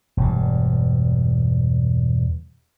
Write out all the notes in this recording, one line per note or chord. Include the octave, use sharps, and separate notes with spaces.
E1 G2